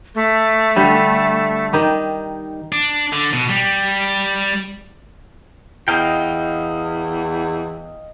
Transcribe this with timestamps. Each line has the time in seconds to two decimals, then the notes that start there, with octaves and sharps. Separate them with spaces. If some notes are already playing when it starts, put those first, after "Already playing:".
0.15 A3
0.76 D3 G3
1.73 D#3 D#4 G4
2.72 D4
3.13 D3
3.33 B2
3.49 G3
5.88 E2 D#5 F5 G5